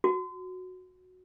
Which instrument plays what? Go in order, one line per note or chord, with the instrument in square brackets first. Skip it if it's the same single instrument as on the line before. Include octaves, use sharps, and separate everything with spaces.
[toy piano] F#4